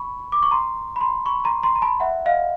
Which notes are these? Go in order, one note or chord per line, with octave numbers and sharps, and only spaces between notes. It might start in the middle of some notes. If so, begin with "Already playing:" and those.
Already playing: B5 C#6
D6
C#6
A#5 C6
B5
A#5 C6
B5 C#6
C#6
A#5 C6
A#5 C6
A#5
A5 B5
E5 F#5
D#5 F5